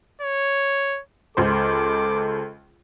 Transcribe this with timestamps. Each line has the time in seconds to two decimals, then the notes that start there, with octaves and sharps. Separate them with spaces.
0.22 C#5
1.37 C#2 A4 C5 D6